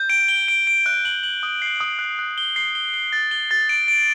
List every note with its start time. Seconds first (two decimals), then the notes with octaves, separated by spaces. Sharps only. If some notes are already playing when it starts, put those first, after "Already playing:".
Already playing: G6
0.10 D7
0.28 G7
0.48 D7
0.67 D7
0.86 F#6
1.05 F#7
1.23 F#7
1.43 D#6
1.62 C7
1.80 D#6
1.99 F#6
2.19 F#6
2.38 G7
2.56 C7
2.75 G7
2.94 G7
3.12 A6
3.31 G7
3.51 A6
3.69 D7
3.88 D7